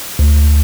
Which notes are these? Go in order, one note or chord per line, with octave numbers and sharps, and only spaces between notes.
D2